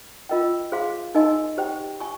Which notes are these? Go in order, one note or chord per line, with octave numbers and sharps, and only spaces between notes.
F4 A#4 D#5 G5
G#4 C5 F5 C6
D#4 A#4 D#5 G#5 C6
G4 C5 G5
G#5 C#6